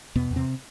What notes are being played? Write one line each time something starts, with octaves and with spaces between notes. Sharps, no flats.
E2 B2 B3
E2
C3 C4